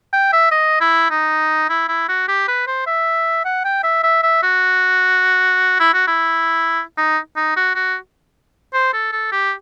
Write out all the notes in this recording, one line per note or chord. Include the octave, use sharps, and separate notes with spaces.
G5
E5
D#5
E4
D#4
E4
E4
F#4
G4
B4
C5
E5
F#5
G5
E5
E5
E5
F#4
E4
F#4
E4
D#4
D#4
F#4
F#4
C5
A4
A4
G4